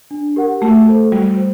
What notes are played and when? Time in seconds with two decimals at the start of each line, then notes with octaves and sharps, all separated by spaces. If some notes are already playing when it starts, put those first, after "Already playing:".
0.11 D4
0.36 G4 A#4 F#5
0.61 A3 F#4
0.87 A4 C5
1.11 G3 F#4
1.37 C5